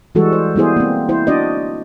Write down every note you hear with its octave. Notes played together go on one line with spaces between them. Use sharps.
E3 G3 G#3 F#4 A4
C5
G3 B3 E4 G#4 C5
A#3 C4
E4 C5
D4 F#4 D5 D#5